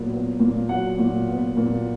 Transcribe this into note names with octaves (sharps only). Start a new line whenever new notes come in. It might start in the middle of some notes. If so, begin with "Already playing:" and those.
Already playing: A#2 F#3 B3
B3
A#2
F#3 F#5
A#2
B3
A#2